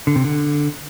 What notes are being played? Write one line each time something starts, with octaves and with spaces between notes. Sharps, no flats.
D3
C3
D3